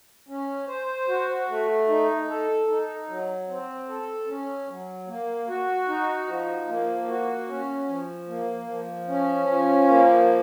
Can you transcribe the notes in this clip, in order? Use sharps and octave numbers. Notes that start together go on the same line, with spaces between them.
C#4
C5
F#4
A3
D#4
A4
D#4
F#3
C4
A4
C#4
F#3
A#3
F#4
D#4
F3
A#3
F#4
C#4
F3
A#3
F3
C#4
F3
A#3